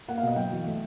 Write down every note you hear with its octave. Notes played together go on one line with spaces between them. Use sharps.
A#3 F#5
F5
B2 D#5
F#3 G5
E2
A3